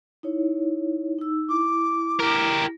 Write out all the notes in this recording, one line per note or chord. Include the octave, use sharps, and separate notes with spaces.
D#4 E4 C#5
D#4 E6
E4 D6
G4 A#4